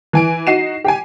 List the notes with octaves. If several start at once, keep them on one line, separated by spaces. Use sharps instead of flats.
E3 G#5 D7
D#4 F#4 C7 D#7 E7
G4 G5 G#5